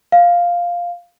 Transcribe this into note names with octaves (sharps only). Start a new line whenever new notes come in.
F5